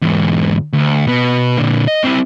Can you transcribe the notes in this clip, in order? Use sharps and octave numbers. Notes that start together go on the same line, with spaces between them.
E2 G#2
D2
B2 B3
A#2 D3
D#5
C4 E4